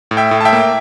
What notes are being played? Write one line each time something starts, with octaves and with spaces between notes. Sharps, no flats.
A2
E5 G5
A2
A5
E5 G5
A#3